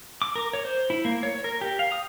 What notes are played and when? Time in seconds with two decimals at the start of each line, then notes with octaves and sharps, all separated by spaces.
0.22 D6
0.36 A#4
0.53 C#5
0.65 C5
0.90 E4
1.05 A#3
1.23 C#5
1.44 A#4
1.61 G4
1.79 F5
1.92 D#6